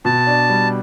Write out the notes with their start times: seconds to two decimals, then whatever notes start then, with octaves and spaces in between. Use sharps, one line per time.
0.05 B2 A5
0.27 D4
0.50 G3